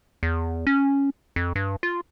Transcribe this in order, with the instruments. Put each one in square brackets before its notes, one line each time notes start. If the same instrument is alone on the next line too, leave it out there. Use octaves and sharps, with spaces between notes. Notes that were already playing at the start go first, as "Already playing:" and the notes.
[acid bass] E2
C#4
F2
G2
F4